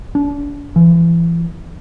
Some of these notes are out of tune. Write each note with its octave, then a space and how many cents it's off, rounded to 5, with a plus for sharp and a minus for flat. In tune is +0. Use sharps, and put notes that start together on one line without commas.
D4 -40
E3 +35